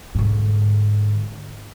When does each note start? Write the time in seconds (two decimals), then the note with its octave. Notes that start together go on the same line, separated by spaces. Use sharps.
0.15 G#2 D3